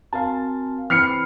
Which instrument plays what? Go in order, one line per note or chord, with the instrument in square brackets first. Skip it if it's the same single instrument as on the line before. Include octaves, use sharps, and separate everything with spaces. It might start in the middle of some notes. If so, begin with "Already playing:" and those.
[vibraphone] C4 G#5 [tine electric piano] F#4 A#4 F5 [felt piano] A5
[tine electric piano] E3 C4 [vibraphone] B5 [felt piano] F6 C7 C#7